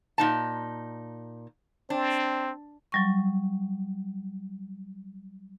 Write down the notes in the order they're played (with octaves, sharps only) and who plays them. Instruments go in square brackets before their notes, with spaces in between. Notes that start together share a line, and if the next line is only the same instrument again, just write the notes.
[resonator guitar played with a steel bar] A#2 D#4 A5
[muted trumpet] C4 [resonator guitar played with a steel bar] D4
[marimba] F#3 G3 C#6